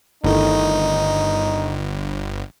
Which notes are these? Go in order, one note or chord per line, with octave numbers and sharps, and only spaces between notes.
G1 D#3 A3 D#4 E4